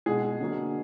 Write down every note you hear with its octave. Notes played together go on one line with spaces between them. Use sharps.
B2 G#3 G#4
D3 F#3 A#3